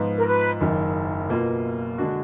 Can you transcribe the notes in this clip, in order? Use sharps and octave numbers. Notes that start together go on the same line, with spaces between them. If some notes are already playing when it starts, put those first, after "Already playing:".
Already playing: G#2 F3 B3 F4
A#4
B4
F#1 F#2 D#3
B2 A#3 F4
D3 G#3 D4 F#4